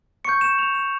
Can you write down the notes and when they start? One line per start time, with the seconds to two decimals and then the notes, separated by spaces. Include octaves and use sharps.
0.25 C#6 G6 C#7
0.41 E7
0.59 F7
0.75 E7